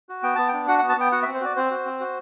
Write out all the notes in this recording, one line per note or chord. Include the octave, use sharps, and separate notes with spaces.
F#4
B3 G5
B3 A5
D4 G5
F#4 F#5
F#5
B3
A5
B3 G5
F#4 F#5
E5
C4
C5
F#4 D5
C4 C5
F#4
C4
F#4